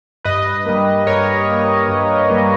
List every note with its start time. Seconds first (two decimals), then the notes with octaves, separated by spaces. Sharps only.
0.24 G2 B4 D#5
0.66 G3 A#3
1.07 G2 A#4 C#5
1.48 G3 A#3
1.88 G2
2.30 G3 A#3